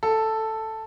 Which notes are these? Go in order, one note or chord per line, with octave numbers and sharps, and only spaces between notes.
A4